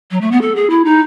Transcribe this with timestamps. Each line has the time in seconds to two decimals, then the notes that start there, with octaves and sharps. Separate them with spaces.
0.11 F#3
0.21 A3
0.32 B3
0.41 A4
0.56 G#4
0.70 E4
0.85 D#4